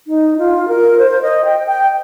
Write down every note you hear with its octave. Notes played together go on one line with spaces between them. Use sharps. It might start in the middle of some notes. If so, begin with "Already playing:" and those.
D#4
F4
A#4
C5
D#5
G5
G5